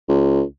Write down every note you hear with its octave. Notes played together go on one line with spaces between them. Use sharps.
C#2